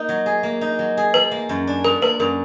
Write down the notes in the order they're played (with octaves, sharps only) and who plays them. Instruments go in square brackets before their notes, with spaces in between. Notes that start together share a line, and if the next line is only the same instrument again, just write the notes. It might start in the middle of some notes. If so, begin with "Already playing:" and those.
Already playing: [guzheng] A#3 D#4
F#3
G#4
A#3
D#4
F#3
G#4
[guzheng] F3 [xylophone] B4
[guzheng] A#3
F#2
D4
[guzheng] F3 [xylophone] A#4
[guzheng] A#3 [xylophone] B4
[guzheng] F#2 [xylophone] A#4